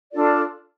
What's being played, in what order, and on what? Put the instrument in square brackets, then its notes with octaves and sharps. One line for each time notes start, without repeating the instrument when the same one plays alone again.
[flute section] D4 F4 A4 D5